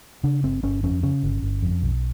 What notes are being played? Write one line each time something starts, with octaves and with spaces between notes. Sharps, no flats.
C#3 D4
G1 C4
G1 C#4
F2 C#4
C#3 C#4
G1
G1
F2
B1